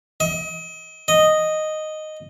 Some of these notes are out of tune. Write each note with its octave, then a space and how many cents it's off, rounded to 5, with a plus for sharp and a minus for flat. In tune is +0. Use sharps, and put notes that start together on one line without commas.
D#5 +35
D#5 -5